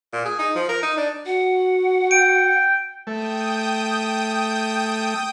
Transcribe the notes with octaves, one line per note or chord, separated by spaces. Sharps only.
A#2
G#4
D#4
F3
A#4
D#4
D4
F#4 F#5
G5 D7
A3 G5 D#6 G6